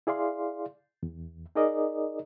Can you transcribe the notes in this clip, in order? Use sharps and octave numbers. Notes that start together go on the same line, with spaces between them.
E4 G#4 D5 F5 C6
E2
D#4 G#4 A#4 D5 D#5